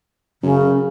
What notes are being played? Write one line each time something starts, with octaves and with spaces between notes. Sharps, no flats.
F#2 C#3